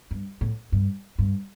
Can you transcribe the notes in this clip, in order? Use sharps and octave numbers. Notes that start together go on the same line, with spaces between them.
G2
A2
G2
G2